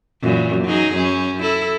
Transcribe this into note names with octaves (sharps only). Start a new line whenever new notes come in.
F#2 A#2 E3
F#3 D#4 G#4
F#2 C#4
E4 A4